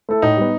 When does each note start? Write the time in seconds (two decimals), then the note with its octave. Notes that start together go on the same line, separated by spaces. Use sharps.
0.09 A3 E4 A4
0.22 A2 D#4
0.37 G3 B3